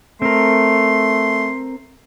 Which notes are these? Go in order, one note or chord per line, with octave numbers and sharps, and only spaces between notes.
A3 C4 A#4 C6